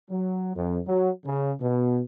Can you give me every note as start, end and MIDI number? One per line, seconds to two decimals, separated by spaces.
0.11 0.54 54
0.56 0.80 41
0.87 1.11 54
1.26 1.53 49
1.61 2.02 47